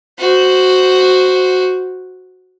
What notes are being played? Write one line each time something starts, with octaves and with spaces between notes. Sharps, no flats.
F#4 C5